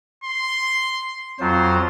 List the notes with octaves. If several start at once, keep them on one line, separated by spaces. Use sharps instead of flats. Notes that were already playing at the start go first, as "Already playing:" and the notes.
C6
F2 F#3 F4 C5